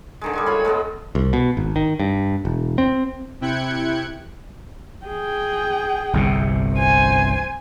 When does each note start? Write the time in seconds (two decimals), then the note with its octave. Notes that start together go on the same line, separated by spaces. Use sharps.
0.21 D3 D#3 G#3
0.33 G3 G#3 G#5
0.46 F4 C#5 B5
0.65 G#3 A3 B3 D#5
1.15 C2
1.33 B2
1.57 G#1
1.76 D#3
2.00 G2
2.45 E1
2.78 C4
3.41 C3 E4 G5 F#6 G#6 C#7
5.06 G#4 G5
6.13 G1 C2 C3
6.74 C5 G#5